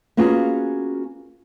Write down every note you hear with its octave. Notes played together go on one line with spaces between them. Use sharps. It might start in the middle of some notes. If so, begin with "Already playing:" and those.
A#3 B3 C#4 F4 F#4 G#4